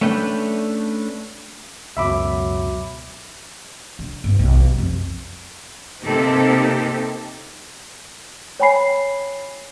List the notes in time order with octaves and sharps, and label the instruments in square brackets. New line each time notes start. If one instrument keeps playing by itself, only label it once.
[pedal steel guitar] A3 C#4 D4 B4 G5
[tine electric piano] C#2 F#2 B2 [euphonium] F#3 [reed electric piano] E5 B5 D6
[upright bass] D3
G1
B1
G3
F2
[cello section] C3 A#3 C4 D#4 G4 A4
[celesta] C#5 G5 G#5 B5 C7